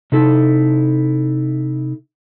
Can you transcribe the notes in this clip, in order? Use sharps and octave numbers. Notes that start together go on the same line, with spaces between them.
C3 D#4 E4 A4